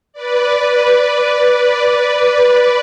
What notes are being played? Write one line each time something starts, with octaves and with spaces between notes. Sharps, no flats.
B4 D5